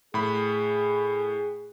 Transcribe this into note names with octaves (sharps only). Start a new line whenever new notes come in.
A2 G#4 B5